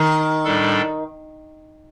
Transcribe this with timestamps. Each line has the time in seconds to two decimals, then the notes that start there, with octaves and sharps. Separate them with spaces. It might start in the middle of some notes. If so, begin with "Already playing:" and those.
Already playing: D#3
0.44 A2 G3 D4 A4